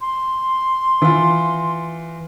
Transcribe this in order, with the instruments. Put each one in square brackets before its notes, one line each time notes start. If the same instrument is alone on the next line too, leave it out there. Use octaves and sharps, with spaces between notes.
[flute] C6
[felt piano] E3 F4